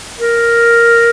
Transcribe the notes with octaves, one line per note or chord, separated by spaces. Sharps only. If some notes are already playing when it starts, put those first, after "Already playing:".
A#4